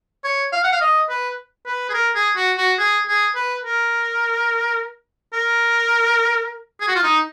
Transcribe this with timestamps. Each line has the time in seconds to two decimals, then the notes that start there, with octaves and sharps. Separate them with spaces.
0.24 C#5
0.53 F5
0.64 F#5
0.72 F5
0.81 D#5
1.10 B4
1.66 B4
1.90 G#4
1.94 A#4
2.15 G#4
2.37 F#4
2.58 F#4
2.79 G#4
3.07 G#4
3.35 B4
3.64 A#4
5.33 A#4
6.81 G#4
6.88 F#4
6.96 F4
7.03 D#4